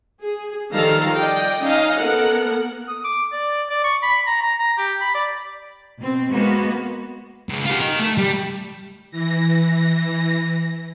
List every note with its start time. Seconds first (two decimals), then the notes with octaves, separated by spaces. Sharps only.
0.22 G#4
0.73 D#3 F3 G3 A4 F5 A#5
1.17 D5 D#5 G5
1.63 C#4 D#4 D#5 F5
1.99 B3 A4 A#4 F#5
2.88 D#6
3.04 D6
3.32 D5
3.70 D5
3.84 C#6
4.03 B5
4.27 A#5
4.43 A#5
4.59 A#5
4.78 G4
5.01 B5
5.15 D5
6.00 B2 C4
6.33 G#3 A#3 B3 F#4
7.49 C#2
7.66 F4 G4
7.80 A#4 D#5
8.00 A3
8.18 G3
9.10 E3 A#6